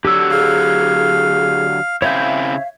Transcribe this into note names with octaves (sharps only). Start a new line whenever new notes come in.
D3 F#3 G4 E6
G#4 F5
C#3 C4 E4 C#5 E5 F5 G6